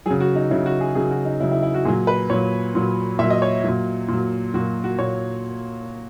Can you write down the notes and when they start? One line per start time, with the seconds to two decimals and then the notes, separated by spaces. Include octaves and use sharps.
0.06 C#3 F#3 G#4
0.20 F#4
0.36 D#4
0.51 C#3 F#3 E4
0.66 F#4
0.81 G#4
0.95 C#3 F#3 G#4
1.11 F#4
1.25 D#4
1.40 C#3 F#3 E4
1.52 E4
1.63 E4
1.74 F#4
1.85 A#2 F#3 G#4
2.07 B4
2.30 A#2 F#3 C#5
2.75 A#2 F#3
3.19 A#2 E5
3.24 F#3
3.30 D#5
3.42 C#5
3.64 A#2 F#3
4.08 A#2 F#3
4.54 A#2 F#3 F#4
4.84 F#4
4.99 A#2 C#5